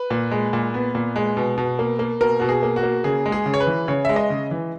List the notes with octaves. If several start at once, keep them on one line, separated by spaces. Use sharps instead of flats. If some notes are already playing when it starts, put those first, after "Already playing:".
Already playing: B4
A#2
G#3
A#2
B3
A#2
G#3
B2
B2
A#3
A#3
B2 A#4
B2 F#4
G#4
A#3
F#4
A#3
C#3 G#4
G#3
G#4
C#3
C#5
B4
E3
C#3 C#5
G#3 E5
D#5
C#3
E3